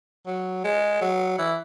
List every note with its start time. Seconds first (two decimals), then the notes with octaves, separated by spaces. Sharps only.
0.26 F#3
0.64 G#3
1.02 F#3
1.38 E3